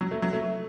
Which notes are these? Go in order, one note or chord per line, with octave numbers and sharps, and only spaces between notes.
F#3
A3
F#3
A3